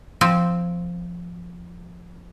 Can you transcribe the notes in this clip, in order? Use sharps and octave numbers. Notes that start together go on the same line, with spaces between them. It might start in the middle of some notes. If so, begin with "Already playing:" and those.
F3 C4